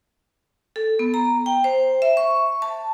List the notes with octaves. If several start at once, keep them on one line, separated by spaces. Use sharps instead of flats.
A4
B3
A#5
G5
C5
E5
C#6
A5